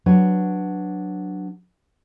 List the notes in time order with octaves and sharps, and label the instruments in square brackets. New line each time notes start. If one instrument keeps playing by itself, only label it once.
[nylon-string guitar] F#3 D4 B4 C#5